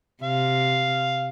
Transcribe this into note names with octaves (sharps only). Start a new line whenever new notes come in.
C3 F5